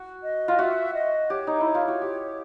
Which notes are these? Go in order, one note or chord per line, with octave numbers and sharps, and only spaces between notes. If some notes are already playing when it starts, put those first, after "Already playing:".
Already playing: F#4
D#5
F4
F#4 E5
D#5
G4 C#5
D#4
E4
C#5
F4
F#4
G4